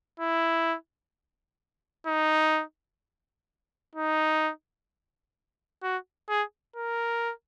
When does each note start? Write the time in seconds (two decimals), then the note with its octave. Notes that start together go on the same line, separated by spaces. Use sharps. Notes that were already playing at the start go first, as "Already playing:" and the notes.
0.20 E4
2.07 D#4
3.95 D#4
5.83 F#4
6.29 G#4
6.76 A#4